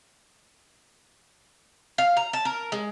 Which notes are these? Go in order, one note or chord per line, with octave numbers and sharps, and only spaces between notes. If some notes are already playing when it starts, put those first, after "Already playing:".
F5
A#5
A5
A#4
G#3